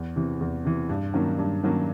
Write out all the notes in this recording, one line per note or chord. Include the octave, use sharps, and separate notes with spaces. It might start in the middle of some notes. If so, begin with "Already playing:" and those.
Already playing: E2
C3 E3
E2
C3 E3
G2
D#3 F#3 A#3 C#4
G2
D#3 F#3 A#3 C#4